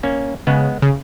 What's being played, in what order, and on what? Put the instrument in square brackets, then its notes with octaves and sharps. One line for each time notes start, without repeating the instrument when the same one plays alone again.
[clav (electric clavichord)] A#3 C#4
[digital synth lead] C#3 [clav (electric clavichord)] G#3 B3
[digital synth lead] C#3